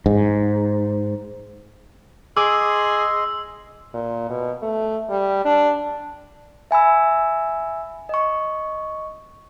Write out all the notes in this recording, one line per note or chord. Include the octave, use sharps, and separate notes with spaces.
G#2
G#4 D#5 C6 D6 E6
A#2
B2
A3
G3
D4
E5 G#5 B5 E6
D#5 C#6